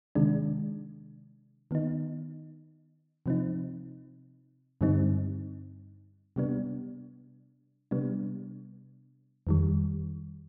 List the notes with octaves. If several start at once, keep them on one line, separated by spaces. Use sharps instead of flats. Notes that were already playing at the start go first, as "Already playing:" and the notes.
C3 D#3 G#3 D4
D#3 B3 D#4
C3 F3 C4 D#4
G2 D3 G3 C4 D#4
C3 G3 B3 D4
C3 G3 B3 D4
F2 D#3 G3